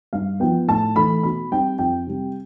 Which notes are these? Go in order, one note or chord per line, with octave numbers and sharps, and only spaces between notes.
G2 F5
F3 B3 G5
A2 A5
E3 A3 B5
B2 B5
G3 C4 G5
F2 G5
C3 G3